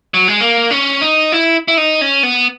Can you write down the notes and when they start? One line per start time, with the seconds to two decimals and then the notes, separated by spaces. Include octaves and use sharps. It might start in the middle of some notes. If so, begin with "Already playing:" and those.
0.14 F#3
0.28 G#3
0.41 A#3
0.71 C#4
1.01 D#4
1.32 E4
1.68 E4
1.77 D#4
2.01 C#4
2.23 B3